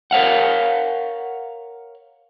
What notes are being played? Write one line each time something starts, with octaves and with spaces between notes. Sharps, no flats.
A#4 C#5 F5 F#5